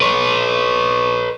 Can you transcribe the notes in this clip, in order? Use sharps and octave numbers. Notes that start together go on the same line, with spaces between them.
B4 C#5